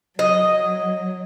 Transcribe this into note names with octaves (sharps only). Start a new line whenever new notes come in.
F#3 D#5